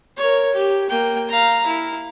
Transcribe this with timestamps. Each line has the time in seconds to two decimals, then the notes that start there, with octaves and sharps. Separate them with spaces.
0.17 A#4 C#5
0.53 G4
0.89 A#3 G5
1.29 F5 A#5
1.67 E4